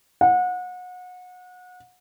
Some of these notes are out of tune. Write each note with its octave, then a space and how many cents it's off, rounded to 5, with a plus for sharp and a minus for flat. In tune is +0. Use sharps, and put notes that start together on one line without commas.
F#5 -30